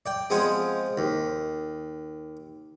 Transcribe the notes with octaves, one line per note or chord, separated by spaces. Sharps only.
D5 G5
F3 G#3 B3 C4 G#4
D#2